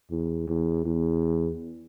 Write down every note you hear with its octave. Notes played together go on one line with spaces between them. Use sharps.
E2
E2
E2